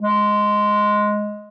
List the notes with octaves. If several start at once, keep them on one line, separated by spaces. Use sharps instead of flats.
G#3